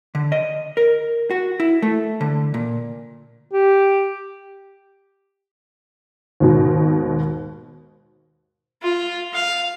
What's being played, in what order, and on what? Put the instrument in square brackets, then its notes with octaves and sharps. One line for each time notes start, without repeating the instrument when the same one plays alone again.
[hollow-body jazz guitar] D3
D#5
A#4
F#4
E4
A3
D3
A#2
[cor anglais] G4
[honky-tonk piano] D#2 G#2 B2
[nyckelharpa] F4
F5